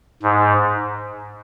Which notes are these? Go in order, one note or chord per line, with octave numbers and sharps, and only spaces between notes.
G#2